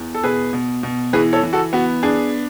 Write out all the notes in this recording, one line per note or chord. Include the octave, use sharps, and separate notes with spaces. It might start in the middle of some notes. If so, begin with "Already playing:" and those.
Already playing: E2
A4
B2 G#4 B4
B2
B2
E3 G#4 B4
A4 C#5
E3
F#4 A4
B3 F#4
D4 G#4